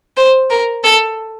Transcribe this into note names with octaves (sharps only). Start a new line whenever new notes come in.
C5
A#4
A4